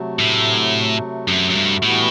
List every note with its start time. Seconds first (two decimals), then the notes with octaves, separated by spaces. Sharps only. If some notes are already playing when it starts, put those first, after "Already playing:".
Already playing: C3 F#3 A3
0.19 A2
1.28 F#2
1.50 F#2
1.55 G2
1.83 A2 E3 G3 B3 F#4